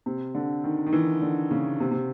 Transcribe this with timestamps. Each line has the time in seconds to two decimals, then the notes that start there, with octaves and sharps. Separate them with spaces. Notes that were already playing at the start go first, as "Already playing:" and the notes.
0.06 C3
0.35 D3
0.64 D#3
0.87 D#3
0.93 E3
1.22 D3
1.51 C#3
1.80 C3
1.91 C3